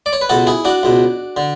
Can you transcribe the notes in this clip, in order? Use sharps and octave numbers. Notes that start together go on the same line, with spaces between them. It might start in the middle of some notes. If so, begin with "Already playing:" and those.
D5
C#5
B4
C#2 B2 F#4 A4
E4 G#4
D4 F#4
C#2 B2
D3